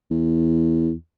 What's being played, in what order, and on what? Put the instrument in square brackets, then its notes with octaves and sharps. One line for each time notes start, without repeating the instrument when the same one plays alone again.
[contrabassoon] E2